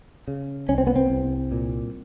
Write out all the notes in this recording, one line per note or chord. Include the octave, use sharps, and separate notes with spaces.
C#3
C2 C#4
C4
B3
C4
C2
A#2